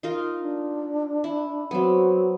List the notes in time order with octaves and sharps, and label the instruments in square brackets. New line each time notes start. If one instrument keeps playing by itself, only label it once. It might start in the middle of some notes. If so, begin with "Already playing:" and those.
[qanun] D#4 F4 A#4
[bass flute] D4
[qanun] E4
[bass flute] F#3 [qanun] B3 C4